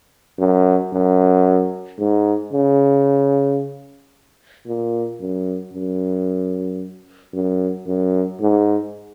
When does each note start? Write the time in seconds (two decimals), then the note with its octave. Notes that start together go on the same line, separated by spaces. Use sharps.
0.39 F#2
0.93 F#2
1.99 G#2
2.53 C#3
4.67 A#2
5.20 F#2
5.74 F#2
7.34 F#2
7.87 F#2
8.41 G#2